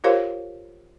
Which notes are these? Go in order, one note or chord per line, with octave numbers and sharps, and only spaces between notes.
F4 G4 A#4 C5 C#5 F5